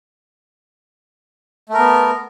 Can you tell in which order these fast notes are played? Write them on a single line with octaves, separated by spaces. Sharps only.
A3 A#4 B3